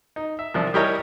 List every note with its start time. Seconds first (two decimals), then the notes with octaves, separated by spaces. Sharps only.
0.16 D#4
0.39 E5
0.54 C2 C3 F3 D5
0.74 G3 E4 G4 A#4 C#5 D#5